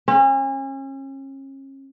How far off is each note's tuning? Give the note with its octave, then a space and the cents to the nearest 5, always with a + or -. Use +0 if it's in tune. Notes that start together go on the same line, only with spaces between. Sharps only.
C#4 -35